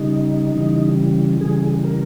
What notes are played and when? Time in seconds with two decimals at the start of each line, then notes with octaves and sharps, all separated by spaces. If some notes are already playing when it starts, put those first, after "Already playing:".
Already playing: C#3 G3 D#4
0.55 C#3 E3 G3
1.41 C#3 E3 G3 G#4
1.84 A#4